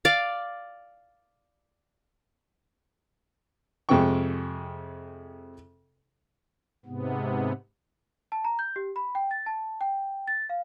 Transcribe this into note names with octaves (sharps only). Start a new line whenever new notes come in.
D5 F5
F2 C3 G#3 C4 G5 C#6
G#2 C3 B3
A5
A#5
G6
G4
B5
G5
A6
A5
G5
A6
F5